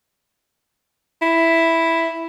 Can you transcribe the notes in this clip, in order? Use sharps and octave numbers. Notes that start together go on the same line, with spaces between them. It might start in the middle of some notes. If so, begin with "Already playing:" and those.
E4